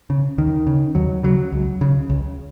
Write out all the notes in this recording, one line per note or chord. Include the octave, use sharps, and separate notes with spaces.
C#3
D#2 D#3
C#3
D#2 F#3
C#3 F#3
C#2
C#3
C#2